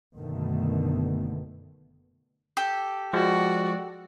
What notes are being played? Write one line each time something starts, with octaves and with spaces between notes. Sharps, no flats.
F#1 B2 D3 D#3 A3 B3
G4 A4
F3 G#3 F#4 D5